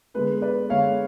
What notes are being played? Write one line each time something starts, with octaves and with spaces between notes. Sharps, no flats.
D3 G#3 B3 B4
B4 D5
D3 G#3 B3 C#5 F5